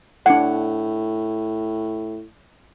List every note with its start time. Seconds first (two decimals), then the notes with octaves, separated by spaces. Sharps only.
0.26 A2 D4 F#5